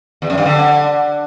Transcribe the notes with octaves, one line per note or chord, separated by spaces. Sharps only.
E2
F#2
G2
D3